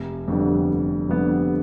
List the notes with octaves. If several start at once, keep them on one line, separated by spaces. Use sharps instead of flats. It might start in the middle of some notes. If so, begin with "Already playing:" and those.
Already playing: F1
F2 D3 G3 B3
F1
F2 D3 G3 B3